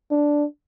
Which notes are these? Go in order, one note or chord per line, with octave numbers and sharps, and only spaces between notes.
D4